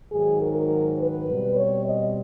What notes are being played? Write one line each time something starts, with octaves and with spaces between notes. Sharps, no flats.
G#2 D#3 F#3 G#4
A#4
B4
B2 G3 C4
C#5
D#5